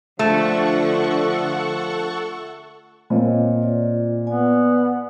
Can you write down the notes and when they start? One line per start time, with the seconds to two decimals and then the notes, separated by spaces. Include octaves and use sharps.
0.19 D3 F3 A3 F4 A4 F#5 C#6
3.10 A#2 C4 C#5 D#5
3.62 F4 D5
4.27 B3 D5 G#5